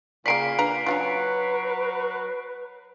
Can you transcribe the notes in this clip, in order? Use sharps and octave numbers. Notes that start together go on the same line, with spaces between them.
A#2 C#3 A#3 A#4 D5 B6 C7 D7
D4 B4 A#5
F#3 C#4 D4 F4 B4